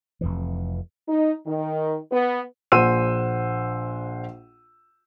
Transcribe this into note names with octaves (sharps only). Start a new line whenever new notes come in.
F1 F2 E3
D#4
D#3
B3
A#1 C5 F#5 E6 D#7